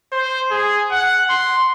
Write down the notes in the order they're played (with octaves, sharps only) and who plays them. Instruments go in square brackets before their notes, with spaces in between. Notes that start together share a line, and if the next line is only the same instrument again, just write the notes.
[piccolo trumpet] C5
G#4
F#5
C6